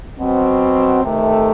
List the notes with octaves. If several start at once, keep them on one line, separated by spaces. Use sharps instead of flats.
B2 F#3 C4
C3 D#3 A3